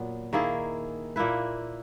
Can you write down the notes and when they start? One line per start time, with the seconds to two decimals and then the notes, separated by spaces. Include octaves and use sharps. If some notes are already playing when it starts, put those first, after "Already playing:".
Already playing: A#2 F#3 B3
0.33 D#3 A#3 E4 G#4
1.16 A#2 A#3 E4 B4